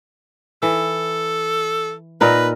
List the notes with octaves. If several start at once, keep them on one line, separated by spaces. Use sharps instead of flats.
E3 A4
A#2 D#4 A#4 B4